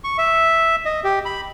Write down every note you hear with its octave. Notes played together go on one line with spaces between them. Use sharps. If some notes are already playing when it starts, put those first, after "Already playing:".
C#6
E5
D#5
G4
B5